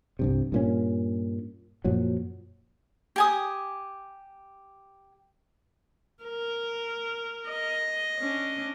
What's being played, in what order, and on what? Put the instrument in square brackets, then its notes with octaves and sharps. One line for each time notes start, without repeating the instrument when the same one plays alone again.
[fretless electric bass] C2 G2 C3
G2 A#2 C#4
F#2 A#2 F3 F#3
[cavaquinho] G4 G#5 D#6
[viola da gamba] A#4
[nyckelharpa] D#5
[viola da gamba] C#4 D4